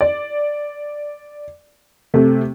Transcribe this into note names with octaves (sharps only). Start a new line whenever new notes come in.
D5
C3 A3